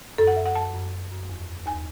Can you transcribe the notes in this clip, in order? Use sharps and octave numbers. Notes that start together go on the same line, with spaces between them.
F#2 A4
F#5
F#2 E5
F#5
F#2 A5
F#2
F#2
F#2
E2
E2
D#2 G#5